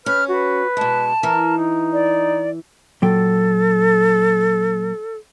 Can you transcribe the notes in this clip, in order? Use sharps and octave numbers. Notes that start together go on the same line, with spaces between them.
C#4 B4 F6
F#4 B4
B2 G#3 A5
E3 A#4
D#4
D5
A#2 F#3 A4 G5